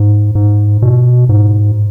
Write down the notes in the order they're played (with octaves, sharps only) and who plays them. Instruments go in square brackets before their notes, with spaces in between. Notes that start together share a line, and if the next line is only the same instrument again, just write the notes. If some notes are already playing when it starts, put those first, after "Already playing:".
Already playing: [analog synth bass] G#2
G#2
B2
G#2